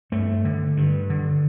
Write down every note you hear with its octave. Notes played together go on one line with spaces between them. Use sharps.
G2 A3
D3
G2
D3